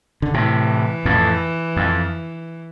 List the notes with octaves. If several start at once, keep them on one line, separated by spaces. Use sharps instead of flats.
D3
A2 C3 E3
F2 A2
F2